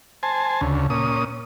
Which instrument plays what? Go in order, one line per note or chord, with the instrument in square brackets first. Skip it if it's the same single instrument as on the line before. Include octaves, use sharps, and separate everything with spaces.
[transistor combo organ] C5 G#5 A5
D2 C#3
A#2 C#4 D#6